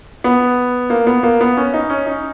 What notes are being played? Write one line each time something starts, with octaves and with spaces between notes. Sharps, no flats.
B3
A#3
B3
A#3
B3
C#4
D#4
C#4
D#4